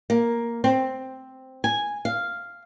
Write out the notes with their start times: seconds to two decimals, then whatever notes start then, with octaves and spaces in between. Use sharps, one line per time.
0.10 A#3
0.64 C4
1.64 G#5
2.05 F5